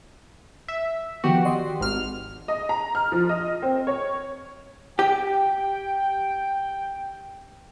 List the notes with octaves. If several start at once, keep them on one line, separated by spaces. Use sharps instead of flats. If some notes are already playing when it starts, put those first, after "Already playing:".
E5
D#3 F3 B3 F#4 G4
D5 D#5 C6
G#1 F6
D#5
A#5
F6
F3
D#5
C4
C#5
G4 G5